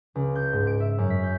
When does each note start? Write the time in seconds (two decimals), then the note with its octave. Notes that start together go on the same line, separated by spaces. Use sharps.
0.15 C#2
0.35 G6
0.53 G#2
0.67 D7
0.80 E5
0.98 F#2
1.10 B6
1.23 G6